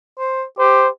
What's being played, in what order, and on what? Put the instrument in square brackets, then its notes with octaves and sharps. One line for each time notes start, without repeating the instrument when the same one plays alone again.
[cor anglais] C5
[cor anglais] G4 [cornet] C5